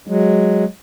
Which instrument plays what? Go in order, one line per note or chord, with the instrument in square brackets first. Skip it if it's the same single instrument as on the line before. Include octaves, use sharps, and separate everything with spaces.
[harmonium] F#3 G#3